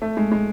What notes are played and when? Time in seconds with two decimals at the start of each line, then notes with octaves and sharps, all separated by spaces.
0.02 A3
0.17 G#3
0.32 G#3